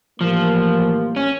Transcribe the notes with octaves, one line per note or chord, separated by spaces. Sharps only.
A2 E3 F3 G3 A#3
C#4